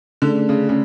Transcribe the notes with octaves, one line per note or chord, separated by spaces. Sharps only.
D3 A3 C#4 G#4 D5
C#3
C#3